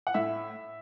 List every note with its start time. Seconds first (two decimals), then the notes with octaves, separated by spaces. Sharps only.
0.07 F#5
0.14 A2 E5